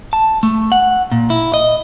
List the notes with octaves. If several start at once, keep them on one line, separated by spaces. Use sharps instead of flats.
A5
A3
F#5
A#2
E4
D#5